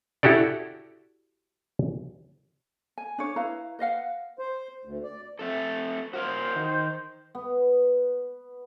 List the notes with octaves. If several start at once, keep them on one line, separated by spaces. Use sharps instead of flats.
E4 F#4 G4 A4 D5
G#5
D4 C#5
E4 B4 F5 A#5
B4 D#5 F5 F#5
C5
D2
D5
A3 C4 A4
F#4 A#4 C5 F5
D#3
B3